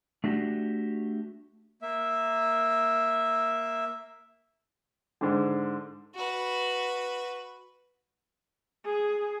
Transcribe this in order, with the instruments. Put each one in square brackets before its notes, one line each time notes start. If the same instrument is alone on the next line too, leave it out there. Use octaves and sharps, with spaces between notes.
[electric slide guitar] A3 D4 F#4 G4
[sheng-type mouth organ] A#3 E5
[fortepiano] G#2 D3
[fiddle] F#4 B4
[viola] G#4